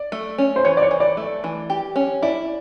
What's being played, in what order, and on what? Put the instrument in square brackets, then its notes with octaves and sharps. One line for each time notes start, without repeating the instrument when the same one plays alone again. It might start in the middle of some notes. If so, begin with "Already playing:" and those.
Already playing: [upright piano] D5
[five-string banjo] A3
C#4
[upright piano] C5
[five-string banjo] E3 [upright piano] C#5
[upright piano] D5
C#5
[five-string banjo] E3
[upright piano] D5
[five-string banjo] A3
E3
G4
C#4
[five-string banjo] E4 [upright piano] D5